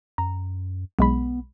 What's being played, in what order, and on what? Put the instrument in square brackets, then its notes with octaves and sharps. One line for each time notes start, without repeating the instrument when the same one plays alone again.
[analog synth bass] F#2 [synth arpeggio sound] A#5
[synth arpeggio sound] B1 G#3 B5 [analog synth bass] B3